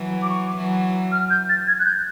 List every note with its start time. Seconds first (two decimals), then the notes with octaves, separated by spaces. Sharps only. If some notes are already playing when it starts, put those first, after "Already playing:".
Already playing: E3 F#3
0.22 D6
0.30 C#6
0.57 E3 F#3
1.12 F6
1.30 G6
1.49 A6
1.68 G#6
1.80 F#6
1.86 G6